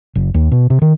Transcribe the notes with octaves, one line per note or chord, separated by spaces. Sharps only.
F#1
D#2
B2
C3
D#3